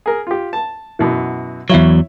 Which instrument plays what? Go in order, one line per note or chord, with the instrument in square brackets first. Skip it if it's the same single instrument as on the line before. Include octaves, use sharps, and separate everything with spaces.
[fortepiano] G#4 A#4
F4 G4
A5
F#2 B2 E3
[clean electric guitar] E2 F#3 [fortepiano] E4 C#5